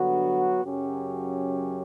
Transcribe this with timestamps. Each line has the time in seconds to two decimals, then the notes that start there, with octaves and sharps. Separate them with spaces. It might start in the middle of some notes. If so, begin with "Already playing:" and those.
Already playing: G2 D3 F#3 B3 F#4
0.62 F#2 C#3 F#3 C#4 G4